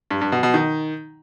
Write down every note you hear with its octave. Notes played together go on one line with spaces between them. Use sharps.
G2
G2
B2
B2
D#3